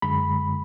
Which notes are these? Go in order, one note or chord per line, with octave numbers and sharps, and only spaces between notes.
F#2 D3 G#3 B5